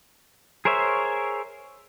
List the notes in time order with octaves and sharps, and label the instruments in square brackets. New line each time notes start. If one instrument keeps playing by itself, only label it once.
[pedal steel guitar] G#4 A#4 C5 C#5 E5